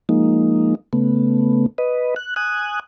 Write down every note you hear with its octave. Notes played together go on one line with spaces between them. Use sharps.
F3 G#3 A#3 D#4
C#3 A3 B3
B4 D#5
F#6
G#5 D#6 F#6